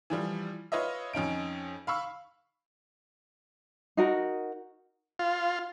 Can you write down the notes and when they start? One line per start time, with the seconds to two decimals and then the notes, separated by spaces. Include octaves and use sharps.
0.10 E3 F3 G3
0.72 F4 B4 C#5 D#5 E5
1.13 F2 C#4 D#4 D7
1.87 F5 B5 C#6 E6
3.97 D#4 F#4 A#4
5.19 F4